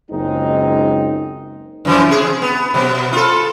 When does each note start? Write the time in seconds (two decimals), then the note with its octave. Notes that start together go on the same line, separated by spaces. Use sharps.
0.11 F#1 C#2 G#3 C4 D#4
1.85 F#2 E3 F3
2.09 C3 G#4
2.42 B3
2.74 B2 F#3 B3
3.13 F4 A4